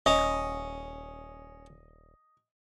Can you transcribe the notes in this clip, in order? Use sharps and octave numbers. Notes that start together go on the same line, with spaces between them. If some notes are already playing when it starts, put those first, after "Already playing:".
D#1 C#4 D#5